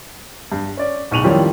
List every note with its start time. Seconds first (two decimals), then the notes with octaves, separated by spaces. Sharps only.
0.52 G2
0.77 C#4 D5
1.11 D1 B1 C#6 D#7 F7 F#7
1.24 F2 A2 D#3 G3 C#4 F4